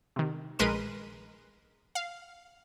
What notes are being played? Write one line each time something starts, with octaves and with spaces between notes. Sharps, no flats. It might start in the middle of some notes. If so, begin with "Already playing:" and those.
C3 D#3
A#1 G#3 A#4 B4 C6 D#7
F5